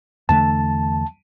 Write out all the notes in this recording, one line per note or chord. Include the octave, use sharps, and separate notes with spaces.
E2 D3 A3 A5